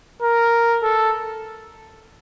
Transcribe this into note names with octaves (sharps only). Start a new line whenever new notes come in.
A#4
A4